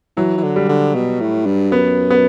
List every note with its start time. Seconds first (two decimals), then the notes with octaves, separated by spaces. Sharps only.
0.17 E3 F#3
0.37 E3
0.43 D3
0.56 G3
0.69 D3
0.95 B2
1.21 A2
1.46 G2
1.72 F#2 B3
2.10 B3